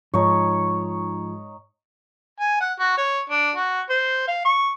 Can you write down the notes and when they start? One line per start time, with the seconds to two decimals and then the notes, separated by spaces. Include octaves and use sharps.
0.14 G#2 F3 D#4 C#5 C#6
2.40 G#5
2.60 F#5
2.79 F#4
2.97 C#5
3.30 D4
3.56 F#4
3.89 C5
4.27 F5
4.45 C#6